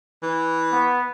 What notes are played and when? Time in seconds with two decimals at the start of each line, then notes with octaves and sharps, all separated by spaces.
0.22 E3
0.72 B3